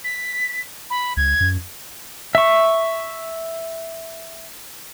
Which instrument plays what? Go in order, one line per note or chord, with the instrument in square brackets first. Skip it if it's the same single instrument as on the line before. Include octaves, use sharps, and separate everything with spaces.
[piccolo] B6
B5
[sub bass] C#2 [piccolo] G#6
[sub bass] F#2
[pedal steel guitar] E5 C#6